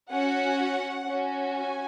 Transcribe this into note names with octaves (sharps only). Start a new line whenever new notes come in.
C#4 F#4 F#5
C#4 F#4
G#5